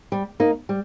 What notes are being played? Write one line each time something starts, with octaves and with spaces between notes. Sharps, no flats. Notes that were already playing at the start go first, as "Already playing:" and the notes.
G3
A#3 D#4
G3